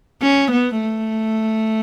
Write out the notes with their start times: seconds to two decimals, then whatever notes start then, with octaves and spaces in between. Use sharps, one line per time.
0.22 C#4
0.52 B3
0.81 A3